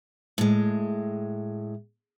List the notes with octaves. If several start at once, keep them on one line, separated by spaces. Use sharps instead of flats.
A2 G#3